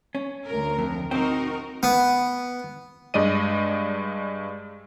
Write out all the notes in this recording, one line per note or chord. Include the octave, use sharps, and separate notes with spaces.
C#4
D2 A#4
F2
C4 D#4 F#4 A#4 C5 G5
B3
G2 G#3 D5 D#5 D#7